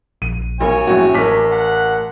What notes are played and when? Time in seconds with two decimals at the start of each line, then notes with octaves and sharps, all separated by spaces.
0.22 A#1 D#7
0.60 B1 A#4 C#5 G#5
0.87 A#1 F#2 A2 F#4 G5
1.14 A1 A#4 A5 D6 B6
1.52 F#5